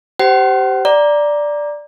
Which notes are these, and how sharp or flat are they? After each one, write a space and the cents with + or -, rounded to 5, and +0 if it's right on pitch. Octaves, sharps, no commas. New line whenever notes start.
G4 -15 C5 -15 F#5 +40
D5 +0 A#5 +10